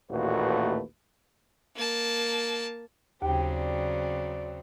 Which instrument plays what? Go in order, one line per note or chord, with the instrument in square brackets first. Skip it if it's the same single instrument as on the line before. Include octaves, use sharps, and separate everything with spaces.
[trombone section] A1 D#2 A#2 A3 F#4 B4
[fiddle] A#3 A5
[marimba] D#2 [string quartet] C#3 F#3 C4 [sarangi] G4
[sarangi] D5